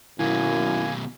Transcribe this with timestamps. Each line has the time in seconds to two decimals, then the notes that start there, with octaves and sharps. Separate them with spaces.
0.19 F#2 B2 D#3 A#3 E4 G#5